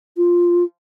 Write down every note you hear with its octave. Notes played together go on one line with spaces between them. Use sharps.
F4